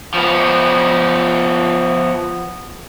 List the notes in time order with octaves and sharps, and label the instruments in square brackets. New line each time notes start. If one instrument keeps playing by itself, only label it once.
[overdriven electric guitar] F3 B3